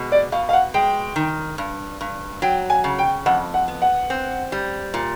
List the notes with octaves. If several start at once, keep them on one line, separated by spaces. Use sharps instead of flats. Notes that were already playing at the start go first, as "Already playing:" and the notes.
Already playing: B2 G#3
D5
B2 F5
F5
F#5
G#3 G5
D#3
G2
G2
F#3 G5
G#5
C#3
G5
F2 F#5
F#5
B3
F#5
C4
G3
A#2